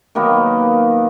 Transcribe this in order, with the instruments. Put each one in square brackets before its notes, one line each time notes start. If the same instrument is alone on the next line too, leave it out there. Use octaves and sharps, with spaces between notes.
[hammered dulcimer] D#3 F#3 A#3 B3